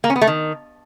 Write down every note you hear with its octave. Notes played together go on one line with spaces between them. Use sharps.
A#3
C#4
B3
A3
D#3